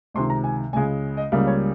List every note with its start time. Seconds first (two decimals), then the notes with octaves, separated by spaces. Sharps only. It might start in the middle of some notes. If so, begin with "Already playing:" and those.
0.14 C#2 C3 D#3 C6
0.30 A#5
0.44 G#5
0.73 C#2 C#3 G#3 G#5
1.17 D#5
1.32 C#2 C#3 G3 A#3 F5
1.47 C#5